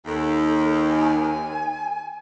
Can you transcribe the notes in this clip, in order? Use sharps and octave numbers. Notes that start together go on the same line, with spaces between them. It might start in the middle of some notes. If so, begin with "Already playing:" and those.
D#2 A4
G#5